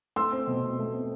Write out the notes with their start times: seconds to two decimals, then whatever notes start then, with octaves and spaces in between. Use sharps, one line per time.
0.16 A3 C6 E6
0.32 C4
0.47 B2
0.63 B2
0.79 A3
0.94 C4